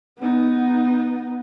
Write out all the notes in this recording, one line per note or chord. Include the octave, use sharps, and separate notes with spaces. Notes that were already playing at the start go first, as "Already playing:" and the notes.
B3 D#4